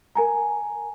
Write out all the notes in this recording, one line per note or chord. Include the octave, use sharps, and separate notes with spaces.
A#4 G#5 A#5